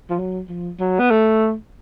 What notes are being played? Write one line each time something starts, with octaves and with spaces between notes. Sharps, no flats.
F3
F#3
F3
F#3
B3
A3